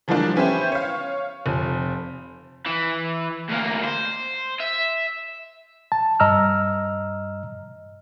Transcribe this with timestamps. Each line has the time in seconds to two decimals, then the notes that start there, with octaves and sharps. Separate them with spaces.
0.08 E3 F3 G3 G#3 A#3 D4
0.36 B3 C#4 E4 G4 C5
0.72 C#5 F5
1.46 F1 F3
2.66 E3
3.49 D2 A#3
3.84 C5
4.60 E5
5.92 A5
6.20 G2 D#5 A#5 E6 F6